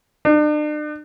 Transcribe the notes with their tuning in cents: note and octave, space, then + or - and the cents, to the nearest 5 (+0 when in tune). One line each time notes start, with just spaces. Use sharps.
D4 +40